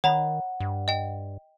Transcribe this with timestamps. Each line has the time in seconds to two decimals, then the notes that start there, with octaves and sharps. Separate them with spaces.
0.04 D#3 C#5 F#5 A#5 B5
0.60 G2
0.88 D#5 G5